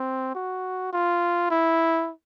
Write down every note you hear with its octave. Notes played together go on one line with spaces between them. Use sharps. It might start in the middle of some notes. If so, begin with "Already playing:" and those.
Already playing: C4
F#4
F4
E4